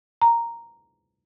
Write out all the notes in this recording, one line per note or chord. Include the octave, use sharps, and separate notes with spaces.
A#5